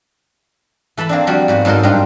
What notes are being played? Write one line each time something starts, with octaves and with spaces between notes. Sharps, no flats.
E3 A4 A5 B5
A#3 C4 D4
F3 G3 A#3 D4 F#4
G#2 B3 F#4
G#2 F#3 D#4 A4 A#4
G2 D4 F4 G4 A#4 C5